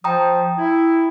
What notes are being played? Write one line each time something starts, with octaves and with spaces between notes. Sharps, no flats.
F3 G5 A#5 D#6
E4